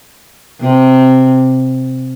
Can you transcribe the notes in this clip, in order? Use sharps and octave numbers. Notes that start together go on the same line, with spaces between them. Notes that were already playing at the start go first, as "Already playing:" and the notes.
C3